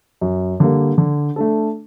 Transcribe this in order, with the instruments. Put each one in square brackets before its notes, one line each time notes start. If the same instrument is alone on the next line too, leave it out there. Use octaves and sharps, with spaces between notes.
[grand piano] F#2
D3 G3 A#3
D3
A3 D4 A4